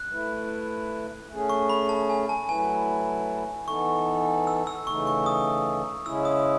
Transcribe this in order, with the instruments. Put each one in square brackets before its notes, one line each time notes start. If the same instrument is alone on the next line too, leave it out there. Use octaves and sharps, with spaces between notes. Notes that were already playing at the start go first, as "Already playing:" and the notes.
Already playing: [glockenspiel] F#6
[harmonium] A3 E4 B4
A3 C#4 G#4
[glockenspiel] C#6
B5
A5
G#5
A5
[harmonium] F#3 A3 E4 B4 [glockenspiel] G#5
[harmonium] E3 B3 D#4 A4 [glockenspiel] C#6
[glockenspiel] E6
E6
[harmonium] C#3 E3 A3 D#4 [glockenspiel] C#6
[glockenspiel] C#6
D#6
[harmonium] C#3 G#3 C#4 E4 [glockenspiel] E6
[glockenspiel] D#6